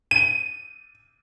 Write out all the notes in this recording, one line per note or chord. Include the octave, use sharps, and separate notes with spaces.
D#7